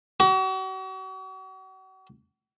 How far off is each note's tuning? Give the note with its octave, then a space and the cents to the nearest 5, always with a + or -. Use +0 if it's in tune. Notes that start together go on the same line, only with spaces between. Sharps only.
F#4 +40